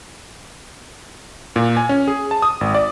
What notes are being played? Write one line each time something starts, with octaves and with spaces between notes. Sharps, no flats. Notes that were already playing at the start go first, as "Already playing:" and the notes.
A#2
G#5
C#4
G#4
A5
D#6
G#1
D5